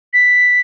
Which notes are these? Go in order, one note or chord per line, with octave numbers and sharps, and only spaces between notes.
B6